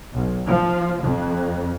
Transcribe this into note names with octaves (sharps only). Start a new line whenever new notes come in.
B1
F3
F2